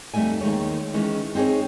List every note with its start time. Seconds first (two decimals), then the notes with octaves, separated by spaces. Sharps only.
0.13 F2 G3 A3 D#4 E5 G#5
0.41 D#2 D#3 G#3 C#5
0.94 D#3 E3 G#3 C#4
1.35 C4 D#4 G#4 C5 C#5